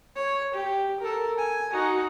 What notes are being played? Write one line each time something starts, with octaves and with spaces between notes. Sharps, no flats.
C#5
G4
A4 A#4
G#5
D#4 F#4